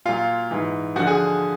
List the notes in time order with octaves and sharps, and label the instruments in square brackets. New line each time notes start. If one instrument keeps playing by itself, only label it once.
[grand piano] A#2 F#3 F4 F5
G#2 E3
D3 F3 F#4 F#5
G#4 G#5